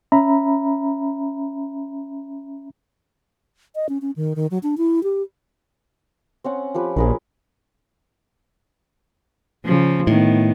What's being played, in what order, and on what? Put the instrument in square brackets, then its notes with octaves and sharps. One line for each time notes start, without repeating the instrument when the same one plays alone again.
[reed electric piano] C#4 E5 A#5 B5
[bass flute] D#5
C#4
C#4
D#3
D#3
F#3
D4
E4
G4
[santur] C4 C#4 F#5
F3 G4 B4
[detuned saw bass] A#1 [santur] G#4 A#4 B4
[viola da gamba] C#3 F3
[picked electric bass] A2 [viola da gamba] D#3 B3